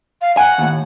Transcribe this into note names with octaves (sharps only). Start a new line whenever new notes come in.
F5
F#5 G#5
D#2 A2